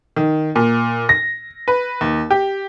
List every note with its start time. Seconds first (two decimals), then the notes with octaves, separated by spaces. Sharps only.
0.16 D#3
0.55 A#2
1.09 A#6
1.68 B4
2.01 D#2
2.31 G4